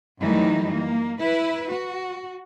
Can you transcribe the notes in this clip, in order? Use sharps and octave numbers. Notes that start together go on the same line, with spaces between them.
F#2 D#3 E3 G3 A3 D#4
A#3
E4 B4
F#4